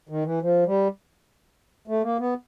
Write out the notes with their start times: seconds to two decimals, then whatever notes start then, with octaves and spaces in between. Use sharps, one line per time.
0.09 D#3
0.25 E3
0.42 F3
0.66 G3
1.88 A3
2.03 A#3
2.19 B3